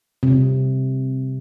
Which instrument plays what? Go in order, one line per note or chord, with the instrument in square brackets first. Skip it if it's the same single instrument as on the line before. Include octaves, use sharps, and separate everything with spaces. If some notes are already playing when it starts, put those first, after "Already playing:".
[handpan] C3